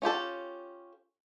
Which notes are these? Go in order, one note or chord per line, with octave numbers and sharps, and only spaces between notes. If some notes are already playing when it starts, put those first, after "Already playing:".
C#4 F4 G4 A4